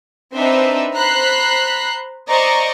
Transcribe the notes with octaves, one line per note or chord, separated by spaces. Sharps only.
C4 D4 D#4 B4 C5 E5
C5 A#5 B5 F#6 B6 C7
C5 D5 D#5 A#5 C#6